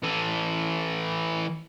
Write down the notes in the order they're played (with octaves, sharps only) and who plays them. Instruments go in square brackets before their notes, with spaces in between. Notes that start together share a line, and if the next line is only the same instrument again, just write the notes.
[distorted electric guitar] E3 A4